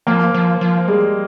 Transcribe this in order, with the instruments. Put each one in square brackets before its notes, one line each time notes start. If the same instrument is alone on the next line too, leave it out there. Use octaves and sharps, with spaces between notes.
[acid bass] F3 [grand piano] A#3
[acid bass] F3
F3
[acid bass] G3 [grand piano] G#3